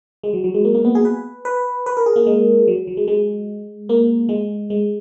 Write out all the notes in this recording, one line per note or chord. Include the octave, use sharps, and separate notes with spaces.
G#3
F#3
F#3
G#3
A#3
A#3
B3
G#4
B4
B4
B4
A#4
G#4
A#3
G#3
F#3
F#3
G#3
G#3
A#3
G#3
G#3